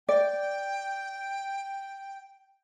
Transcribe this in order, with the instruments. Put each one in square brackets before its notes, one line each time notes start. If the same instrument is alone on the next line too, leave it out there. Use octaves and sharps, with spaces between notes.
[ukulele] D5 [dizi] G5